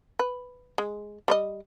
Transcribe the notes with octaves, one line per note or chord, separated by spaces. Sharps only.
B4
G#3
G3 C5 D#5